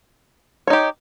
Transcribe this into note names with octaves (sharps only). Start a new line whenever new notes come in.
D#4 G4 C#5